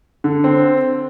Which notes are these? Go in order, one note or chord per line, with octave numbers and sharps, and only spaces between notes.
D3
C4